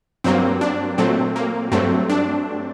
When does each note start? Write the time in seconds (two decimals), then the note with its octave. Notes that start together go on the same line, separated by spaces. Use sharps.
0.24 G2 F#3 A#3 C4
0.61 D4
0.98 A#2 F#3 A3 C4
1.36 A#3
1.71 G2 F#3 A3 C4
2.09 D4